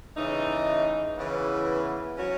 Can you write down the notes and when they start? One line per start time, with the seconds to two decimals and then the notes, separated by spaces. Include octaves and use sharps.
0.16 C#3 E3 A3 D#4
1.17 C#3 E3 B3 E4 B4
2.17 F#3 C#4 F#4 C#5